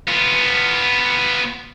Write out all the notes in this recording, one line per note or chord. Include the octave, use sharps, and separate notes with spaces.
B3 F4